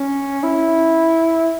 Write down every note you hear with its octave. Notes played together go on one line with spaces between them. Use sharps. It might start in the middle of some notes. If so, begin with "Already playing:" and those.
Already playing: C#4
E4